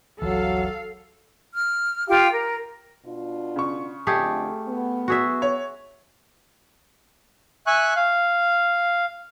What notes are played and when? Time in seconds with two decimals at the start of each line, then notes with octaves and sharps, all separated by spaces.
0.22 G1 C#2 E3 F#3 A4 F5
1.53 F6
2.08 F4 G4 F5 G5
2.32 A#4
3.05 B2 D4 F4
3.56 C#3 C#6
4.07 F2 D3 A3 G4 G#4
4.68 B3
5.08 F#4 G#4 E5
5.42 C#5
7.67 E5 G#5 C#6 F#6
7.96 F5